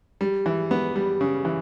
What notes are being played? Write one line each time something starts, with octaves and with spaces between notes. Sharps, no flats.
G3
E3
B3
G3
C#3
E3